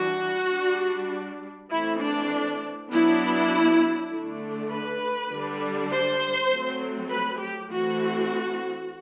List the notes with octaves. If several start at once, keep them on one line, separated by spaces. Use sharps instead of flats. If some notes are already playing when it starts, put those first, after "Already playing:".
Already playing: E3 G3 D4 F#4
G3 D4
E3 A3 C4 E4
D4
F#3 B3 D4 E4
D3 A3 D4
B4
D3 G3 D4
C5
F#3 A3 C4
B4
G4
E3 A3 C4 F#4